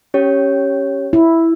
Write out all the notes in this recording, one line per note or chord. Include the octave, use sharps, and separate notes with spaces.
C#4 G4 C#5
E4